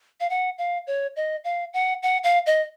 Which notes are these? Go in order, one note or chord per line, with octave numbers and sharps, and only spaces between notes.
F5
F#5
F5
C#5
D#5
F5
F#5
F#5
F5
D#5